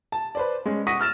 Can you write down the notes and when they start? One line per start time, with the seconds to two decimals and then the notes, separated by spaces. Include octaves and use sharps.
0.12 A5
0.35 B4 C5 D5
0.66 G#3 C#4
0.87 F#5 C#6 D#6 A#6 B6 D#7
0.99 E6 F6 A6 E7